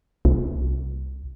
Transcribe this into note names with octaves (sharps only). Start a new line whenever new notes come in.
C2